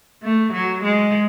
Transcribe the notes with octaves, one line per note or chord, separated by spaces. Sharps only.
A3
F#3
G#3